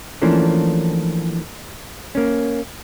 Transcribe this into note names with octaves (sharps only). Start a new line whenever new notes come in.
E3 F3 A3 A#3 C#4 D4
A#3 C#4